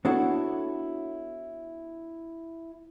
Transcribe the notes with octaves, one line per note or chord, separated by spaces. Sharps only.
B3 D4 E4 F#4 A4 C#5